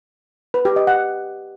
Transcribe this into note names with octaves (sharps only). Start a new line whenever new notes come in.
B4
G4
D#5
F#5